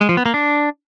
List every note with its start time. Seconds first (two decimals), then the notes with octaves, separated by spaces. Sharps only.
0.01 G#3
0.09 F3
0.17 B3
0.26 A#3
0.34 D4